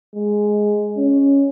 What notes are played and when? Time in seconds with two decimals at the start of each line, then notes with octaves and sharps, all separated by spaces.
0.15 G#3
0.97 C#4